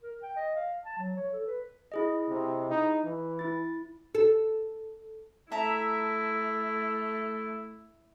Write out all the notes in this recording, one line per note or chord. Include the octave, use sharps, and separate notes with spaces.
A#4
G5
D#5
F5
A5
F#3
C#5
A4
B4
E4 G#4 D#5
C3
D#4
E3
E4 A6
A4
A3 E4 E5 A5 A#5